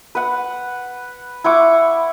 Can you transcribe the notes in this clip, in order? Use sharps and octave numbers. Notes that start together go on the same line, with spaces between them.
B4 F#5
E4 F#5 C#6 D6